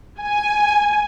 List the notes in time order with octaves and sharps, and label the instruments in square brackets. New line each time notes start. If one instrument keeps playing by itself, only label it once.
[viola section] G#5